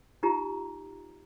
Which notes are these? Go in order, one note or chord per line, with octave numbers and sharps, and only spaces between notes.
D#4 F4 G4 A#5